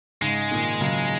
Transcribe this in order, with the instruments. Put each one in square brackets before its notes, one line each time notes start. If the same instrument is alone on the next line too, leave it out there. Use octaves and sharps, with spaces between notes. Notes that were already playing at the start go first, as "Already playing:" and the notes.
[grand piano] G#2 C#3 [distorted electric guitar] G#3
[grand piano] A#2 D#3
C#3 F#3